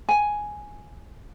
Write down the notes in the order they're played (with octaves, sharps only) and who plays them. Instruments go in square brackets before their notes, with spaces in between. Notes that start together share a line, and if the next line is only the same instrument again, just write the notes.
[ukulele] G#5